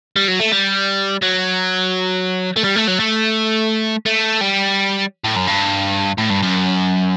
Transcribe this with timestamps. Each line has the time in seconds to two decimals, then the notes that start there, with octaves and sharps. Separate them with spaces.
0.16 G3
0.28 F#3
0.40 A3
0.52 G3
1.23 F#3
2.57 A3
2.64 G3
2.76 A3
2.88 F#3
3.00 A3
4.06 A3
4.41 G3
5.24 A2
5.36 F#2
5.48 G2
6.18 A2
6.30 G2
6.42 F#2